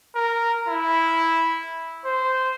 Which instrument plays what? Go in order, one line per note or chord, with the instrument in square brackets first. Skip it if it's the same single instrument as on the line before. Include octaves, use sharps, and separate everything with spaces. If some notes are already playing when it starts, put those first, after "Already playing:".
[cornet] A#4
E4
C5